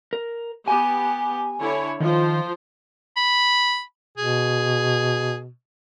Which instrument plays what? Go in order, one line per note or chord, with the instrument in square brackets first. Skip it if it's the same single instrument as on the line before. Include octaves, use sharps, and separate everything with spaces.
[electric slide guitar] A#4
[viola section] B3 G4 [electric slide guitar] G#5
[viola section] D3 E4 C#5
[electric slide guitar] D#3 [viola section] F3 F4 C5
[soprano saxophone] B5
[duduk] B2 [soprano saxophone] G#4